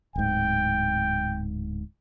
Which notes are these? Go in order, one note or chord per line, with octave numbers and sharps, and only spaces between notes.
D1 G#2 G5